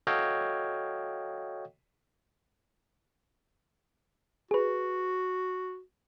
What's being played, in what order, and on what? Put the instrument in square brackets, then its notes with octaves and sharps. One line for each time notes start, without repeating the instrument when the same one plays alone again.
[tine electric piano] F#4 A4 C#5 D#5 F5 G5
[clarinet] F#4 [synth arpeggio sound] G#4 B4